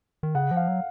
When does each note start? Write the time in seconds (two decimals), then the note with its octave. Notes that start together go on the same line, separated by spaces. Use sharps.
0.23 D#3
0.35 C#3 F#5
0.51 F3
0.56 F5
0.68 F#3